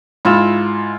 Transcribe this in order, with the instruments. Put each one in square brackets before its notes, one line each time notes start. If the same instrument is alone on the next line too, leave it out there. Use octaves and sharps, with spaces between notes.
[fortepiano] G#2 [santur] E4 F4 E6